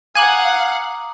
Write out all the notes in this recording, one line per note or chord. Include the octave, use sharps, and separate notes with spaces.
F5 F#5 G#5 A#5 D6 D#6 F#6